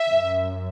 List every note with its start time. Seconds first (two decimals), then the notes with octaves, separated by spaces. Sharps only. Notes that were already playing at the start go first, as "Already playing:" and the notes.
Already playing: E5
0.09 F#2